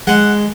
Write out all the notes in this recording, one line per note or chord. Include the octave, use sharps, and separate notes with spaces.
G#3 F#5